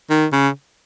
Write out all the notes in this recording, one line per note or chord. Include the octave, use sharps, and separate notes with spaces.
D#3
C#3